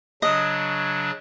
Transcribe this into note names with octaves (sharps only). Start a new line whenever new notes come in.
C#3 F#3 D4 D#5